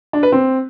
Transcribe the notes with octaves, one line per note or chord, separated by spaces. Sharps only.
D4
B4
C4